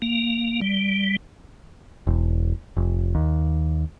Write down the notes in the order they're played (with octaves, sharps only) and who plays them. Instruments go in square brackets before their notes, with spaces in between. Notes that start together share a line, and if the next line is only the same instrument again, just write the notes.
[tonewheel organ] A#3
G3
[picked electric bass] E1
F1
D#2